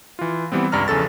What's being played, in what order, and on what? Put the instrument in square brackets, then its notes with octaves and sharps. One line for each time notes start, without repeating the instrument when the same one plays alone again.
[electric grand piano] E3 F4
E3 G3 B3 C4
C#2 G2 D5 A#5 F6
A#1 E2 C#3 A4 A6